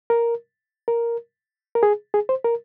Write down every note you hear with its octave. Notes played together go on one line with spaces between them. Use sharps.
A#4
A#4
A#4
G#4
G#4
C5
A#4